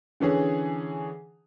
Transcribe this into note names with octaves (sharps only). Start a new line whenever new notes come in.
D3 E3 C#4 G#4